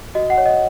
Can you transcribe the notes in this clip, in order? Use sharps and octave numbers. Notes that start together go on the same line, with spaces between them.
F#4 D#5
F#5
C#5
D#5